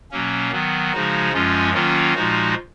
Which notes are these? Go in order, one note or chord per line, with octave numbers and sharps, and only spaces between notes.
B2 F#3 A#3 C#4
D#3 F#3 B3
C#3 F3 G#3 D#4 F#4
F#2 F3 G#3 C#4 F4
D#3 F#3 A#3 C#4 F4
A#2 F3 G#3 D#4 F#4